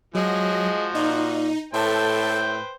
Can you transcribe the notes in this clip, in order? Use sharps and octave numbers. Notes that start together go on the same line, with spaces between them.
F3 F#3 G#3 F#4 A#6
A#2 D#4
A2 A4 B4 C5 G5 A5